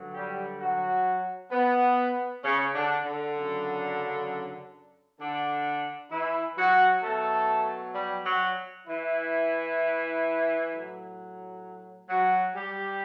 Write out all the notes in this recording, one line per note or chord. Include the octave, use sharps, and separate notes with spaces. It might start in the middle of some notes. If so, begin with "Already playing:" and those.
Already playing: G2 D3 F#3
G3 G4
F#3 F#4
B3
C#3 C#4
D3 D4
D3 D4
F#2 C#3 F#3
D3 D4
E3 E4
F#3 F#4
B2 F#3 A3 A4
G3 G4
F#3 F#4
E3 E4
A2 F#3
F#3 F#4
G3 G4